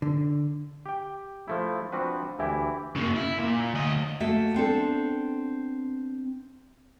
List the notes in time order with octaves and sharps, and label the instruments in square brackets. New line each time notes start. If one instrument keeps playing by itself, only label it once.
[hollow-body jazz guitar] D3
[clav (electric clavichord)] G4 G5
F3 A3 E4
F3 C4 D4 F#4 B4
D2 E3 E4 G4
[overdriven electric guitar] C#3 A#3
E4
A#2
D2 D#5
[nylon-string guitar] A3 A#3 F#4 E5
B3 C4 D4 A4